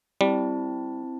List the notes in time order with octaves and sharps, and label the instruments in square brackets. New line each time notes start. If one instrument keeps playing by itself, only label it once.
[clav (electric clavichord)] G3 [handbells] C4 E4 A5